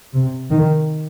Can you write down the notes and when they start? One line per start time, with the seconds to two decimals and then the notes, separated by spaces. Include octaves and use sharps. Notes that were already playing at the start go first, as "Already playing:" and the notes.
0.14 C3
0.51 D#3